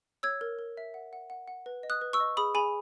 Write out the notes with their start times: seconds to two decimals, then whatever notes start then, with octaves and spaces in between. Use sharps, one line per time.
0.23 C#5 E6 G#6
0.41 A#4
0.59 A#4
0.77 E5
0.94 F#5
1.13 F#5
1.30 F#5
1.48 F#5
1.66 B4
1.83 D#5
1.90 D#6 F#6
2.01 B4
2.13 C#6 E6
2.20 D#5
2.37 G#4 B5 D#6
2.55 G#4 G#5 B5